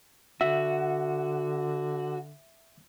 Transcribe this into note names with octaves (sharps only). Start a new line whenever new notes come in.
D3 F#4 E5